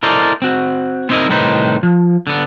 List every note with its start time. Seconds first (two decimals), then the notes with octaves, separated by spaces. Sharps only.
0.03 E4 A4 A#4 C5 D5 D#5
0.42 C4 F#4
1.09 B3 C4 D#4 E4 A#4 D#5
1.29 C2 A2 D#3 D#4 B4 C5
1.83 F3
2.27 D3 B3